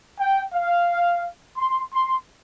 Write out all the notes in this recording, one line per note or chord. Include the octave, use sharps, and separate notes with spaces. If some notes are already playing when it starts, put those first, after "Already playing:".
G5
F5
C6
C6